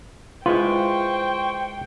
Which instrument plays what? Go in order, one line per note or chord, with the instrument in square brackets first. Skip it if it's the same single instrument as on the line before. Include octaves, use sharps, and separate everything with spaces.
[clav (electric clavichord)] G#3 E4 B4 [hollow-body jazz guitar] F4 [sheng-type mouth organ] C5 C#6 [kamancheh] G5